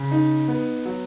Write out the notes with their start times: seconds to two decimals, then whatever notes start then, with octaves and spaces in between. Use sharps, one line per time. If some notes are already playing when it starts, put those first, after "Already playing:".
Already playing: C#3
0.11 D#4
0.48 B3
0.86 F#3